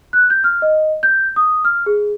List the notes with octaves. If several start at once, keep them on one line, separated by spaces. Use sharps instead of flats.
F#6
G6
F6
D#5
G6
D#6
F6
G#4